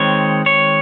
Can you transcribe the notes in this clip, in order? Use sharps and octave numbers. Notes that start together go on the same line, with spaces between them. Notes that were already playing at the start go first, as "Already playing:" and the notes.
Already playing: D#3 G#3 C4 C#5
C#5